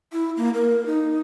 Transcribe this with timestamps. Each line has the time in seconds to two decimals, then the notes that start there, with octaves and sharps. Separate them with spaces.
0.13 E4
0.37 A#3
0.54 A#4
0.86 D#4